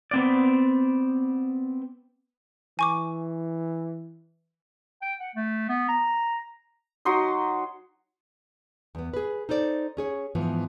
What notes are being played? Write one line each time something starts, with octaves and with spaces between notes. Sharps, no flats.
B3 C4 D5
E3 G#5 C#6 D6
G5
F#5
A3
B3
A#5
F#3 D#4 C6 D#6
E2 B3
G#4 B4
D#4 A4 C5 D5
C#4 G#4 C#5
G#2 E3 F3 B3